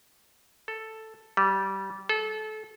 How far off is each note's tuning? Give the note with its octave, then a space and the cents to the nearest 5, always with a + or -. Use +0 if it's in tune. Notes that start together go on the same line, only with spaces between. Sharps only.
A4 +0
G3 -20
A4 -30